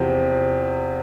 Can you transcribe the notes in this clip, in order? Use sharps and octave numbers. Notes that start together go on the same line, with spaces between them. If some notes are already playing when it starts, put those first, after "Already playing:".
Already playing: E2 C3 F3 C4